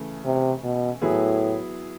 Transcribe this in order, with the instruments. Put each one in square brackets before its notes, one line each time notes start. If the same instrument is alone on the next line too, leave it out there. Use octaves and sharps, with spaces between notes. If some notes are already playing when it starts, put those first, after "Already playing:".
Already playing: [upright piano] C#3 E3 A3
[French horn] C3
B2
[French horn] A2 [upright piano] F#3 B3 E4 G#4